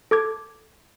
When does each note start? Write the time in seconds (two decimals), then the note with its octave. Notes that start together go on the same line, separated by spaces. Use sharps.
0.11 A4 D6 G#6